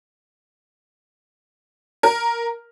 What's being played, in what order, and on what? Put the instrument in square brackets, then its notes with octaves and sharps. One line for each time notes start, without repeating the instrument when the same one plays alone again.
[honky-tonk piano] A#4